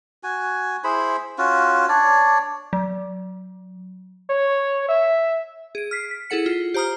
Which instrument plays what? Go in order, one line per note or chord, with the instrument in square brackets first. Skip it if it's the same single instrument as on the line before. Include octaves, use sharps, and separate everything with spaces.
[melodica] F#4 G#5
E4 G#4 C5 B5
C#4 F4 F#4
D4 C#5 D5
[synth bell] F#3
[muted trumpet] C#5
E5
[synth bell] G#4 D7
F6 B6 C7
B6
E4 G#4 A4 F#5 C#7
F4
G4 C5 A#5 D#6 F6